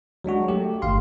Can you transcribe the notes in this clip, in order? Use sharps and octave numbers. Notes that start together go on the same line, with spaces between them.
F#3 G#3 D4 F#4
A3 G4
G1 F5 C6